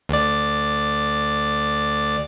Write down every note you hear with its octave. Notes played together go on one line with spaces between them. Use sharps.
D2 D5